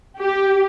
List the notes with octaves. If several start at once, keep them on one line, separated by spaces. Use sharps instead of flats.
G4